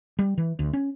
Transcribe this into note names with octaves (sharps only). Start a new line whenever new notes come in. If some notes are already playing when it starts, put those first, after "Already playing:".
G3
E3
D2
C#4